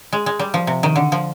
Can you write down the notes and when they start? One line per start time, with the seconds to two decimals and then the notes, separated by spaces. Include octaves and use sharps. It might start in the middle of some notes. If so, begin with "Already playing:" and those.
0.13 G#3
0.26 G#3
0.39 G3
0.54 F3
0.67 C3
0.83 D#3
0.96 D3
1.12 F3